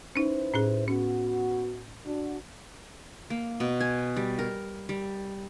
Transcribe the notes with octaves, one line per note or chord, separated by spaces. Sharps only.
C#4 D#4 E4 B4 C5
A2 C#4 G#4
B3 C#4 F#4
D4 F#4
A#3
B2
G#5
G3
A#4
G3